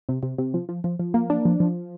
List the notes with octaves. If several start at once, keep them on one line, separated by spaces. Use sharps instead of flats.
C3
C3
C3
F3
F3
F3
F3
A#3
D4
F3
F3